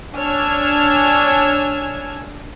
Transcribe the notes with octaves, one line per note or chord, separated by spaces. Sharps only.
D4 C#5 G#5 E6 F6 G#6